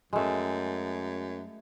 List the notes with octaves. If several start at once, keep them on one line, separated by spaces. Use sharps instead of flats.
F#2 G#3 A3